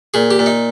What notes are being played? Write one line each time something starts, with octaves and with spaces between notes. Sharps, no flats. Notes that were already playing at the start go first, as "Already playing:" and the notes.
A#2 G#4
G4
A#2
D#4